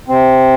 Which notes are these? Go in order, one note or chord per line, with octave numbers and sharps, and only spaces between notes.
C3 C4